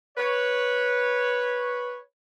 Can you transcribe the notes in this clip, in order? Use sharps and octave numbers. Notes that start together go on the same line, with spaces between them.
B4 C#5